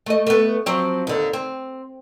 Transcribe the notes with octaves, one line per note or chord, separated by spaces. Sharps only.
A3 D#5
A3 B3
F3 F#3 C4
D#2 D3
C4